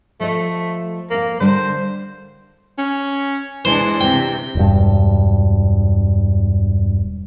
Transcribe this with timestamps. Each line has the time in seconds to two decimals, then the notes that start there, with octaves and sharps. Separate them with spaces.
0.20 F3 A3 D#5
1.10 F2 A#3 F5
1.40 D3 G3 D4 C5
2.78 C#4
3.65 E3 G#3 D4 C5
4.01 C3 G5
4.55 E1 G2